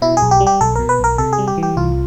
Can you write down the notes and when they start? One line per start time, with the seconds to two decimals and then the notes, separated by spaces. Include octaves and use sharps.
0.02 B2 E4
0.17 G#4
0.22 B1
0.31 G4
0.40 G3
0.47 G4
0.61 B1 A4
0.75 B2 A#4
0.89 B4
1.00 B1 A#4
1.18 C3 A4
1.33 G#4
1.38 G3
1.47 G4
1.58 E3
1.63 G4
1.77 C2 F4